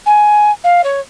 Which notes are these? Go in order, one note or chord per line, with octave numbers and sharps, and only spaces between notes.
G#5
F5
C#5